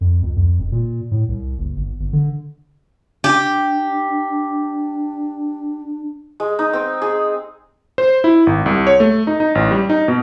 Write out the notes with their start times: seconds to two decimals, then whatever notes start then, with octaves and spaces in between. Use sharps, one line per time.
0.01 F2
0.23 C#2
0.36 F2
0.59 E1
0.72 A#2
1.11 A2
1.29 C2
1.58 F#1
1.76 G1
2.00 G1
2.13 D3
3.24 D4 G4
6.40 G#3
6.59 D#4
6.73 C4
7.02 G#4
7.98 C5
8.24 E4
8.47 G#1
8.66 C2
8.87 C#5
9.00 A3
9.27 D#4
9.40 D#4
9.55 A1
9.71 G3
9.90 D#4
10.08 B2